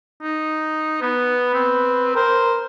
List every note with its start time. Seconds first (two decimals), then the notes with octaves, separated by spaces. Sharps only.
0.22 D#4
1.02 B3 B4
1.54 C4
2.15 A#4 C5